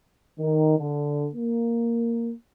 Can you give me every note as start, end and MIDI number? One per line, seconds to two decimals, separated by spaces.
0.39 0.78 51
0.78 1.28 50
1.35 2.32 58